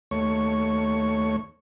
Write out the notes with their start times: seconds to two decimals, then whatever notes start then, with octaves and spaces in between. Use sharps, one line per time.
0.11 D#2 A3 C#5 C#6